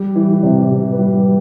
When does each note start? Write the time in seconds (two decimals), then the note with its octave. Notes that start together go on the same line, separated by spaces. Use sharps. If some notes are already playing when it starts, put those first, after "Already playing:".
Already playing: G3
0.15 E3
0.43 C3
0.71 C3
0.92 B4
0.99 G3